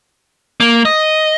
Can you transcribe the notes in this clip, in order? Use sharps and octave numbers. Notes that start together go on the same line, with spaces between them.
A#3
D#5